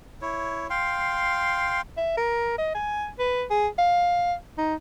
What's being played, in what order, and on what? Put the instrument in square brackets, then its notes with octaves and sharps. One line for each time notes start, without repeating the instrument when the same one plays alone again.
[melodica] E4 C#5
F5 G5 C6
[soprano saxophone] E5
A#4
D#5
G#5
B4
G#4
F5
D#4